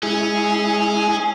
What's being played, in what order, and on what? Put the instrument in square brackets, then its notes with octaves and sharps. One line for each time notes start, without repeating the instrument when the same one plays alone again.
[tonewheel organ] G#3 E4 [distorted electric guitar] C#4 [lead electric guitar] G#4